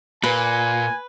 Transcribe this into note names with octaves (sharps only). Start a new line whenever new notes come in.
A#2 B4 G#5